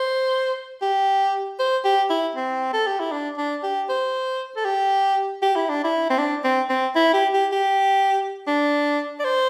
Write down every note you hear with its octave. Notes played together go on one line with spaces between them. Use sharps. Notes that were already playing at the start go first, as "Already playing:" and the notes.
Already playing: C5
G4
C5
G4
E4
C4
A4
G4
E4
D4
D4
G4
C5
A4
G4
G4
E4
D4
E4
C4
D4
C4
C4
E4
G4
G4
G4
D4
D5
C5